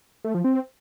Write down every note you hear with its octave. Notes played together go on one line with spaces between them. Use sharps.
A3
F3
C4